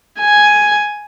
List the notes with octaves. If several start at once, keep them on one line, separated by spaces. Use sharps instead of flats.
G#5